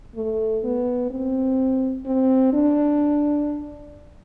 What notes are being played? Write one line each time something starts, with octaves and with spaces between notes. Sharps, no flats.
A3
B3
C4
C4
D4